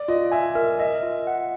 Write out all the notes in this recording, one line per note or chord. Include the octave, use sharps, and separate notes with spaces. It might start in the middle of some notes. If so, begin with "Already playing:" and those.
Already playing: D5
F4 D#5
E5 G#5
A#4 E5
D#5 E5
F4
F#5